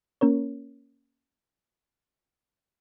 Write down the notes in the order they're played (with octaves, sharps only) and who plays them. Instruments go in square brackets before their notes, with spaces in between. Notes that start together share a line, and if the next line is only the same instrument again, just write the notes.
[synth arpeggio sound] A#3 C#4 A#4 C#5